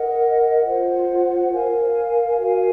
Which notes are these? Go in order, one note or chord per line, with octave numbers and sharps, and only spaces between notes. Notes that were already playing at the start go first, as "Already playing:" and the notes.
Already playing: A#4 D#5 F#5
F4 C5 F#5
A#4 F5 G#5
F#4 A#4 F5 G#5